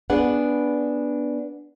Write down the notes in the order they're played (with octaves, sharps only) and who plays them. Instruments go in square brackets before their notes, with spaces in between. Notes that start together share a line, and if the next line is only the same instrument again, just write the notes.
[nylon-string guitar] B3 D4 G#4 B4 F#5